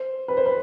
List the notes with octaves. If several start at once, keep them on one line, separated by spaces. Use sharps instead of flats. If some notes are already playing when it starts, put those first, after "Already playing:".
Already playing: C5
B4
C5
B4